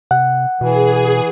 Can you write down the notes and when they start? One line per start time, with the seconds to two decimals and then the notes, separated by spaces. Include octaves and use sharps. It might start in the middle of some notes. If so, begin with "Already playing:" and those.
0.11 C3 F#5
0.61 B2 E3 G#4